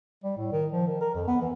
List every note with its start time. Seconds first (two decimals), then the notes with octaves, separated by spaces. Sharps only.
0.24 G3
0.37 A2
0.52 D#3
0.72 F3
0.87 D#3
1.01 A#4
1.14 F2
1.28 B3
1.41 E3